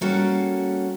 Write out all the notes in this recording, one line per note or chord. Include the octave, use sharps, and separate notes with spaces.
G3 A#3 C#4 F#4 A4